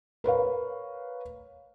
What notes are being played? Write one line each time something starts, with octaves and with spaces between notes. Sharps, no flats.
A#4 B4 C#5 F5